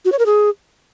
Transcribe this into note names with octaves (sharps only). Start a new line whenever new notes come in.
F#4
C#5
A#4
G#4